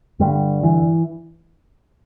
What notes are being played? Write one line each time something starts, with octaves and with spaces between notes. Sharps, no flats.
G2 D3 G3
E3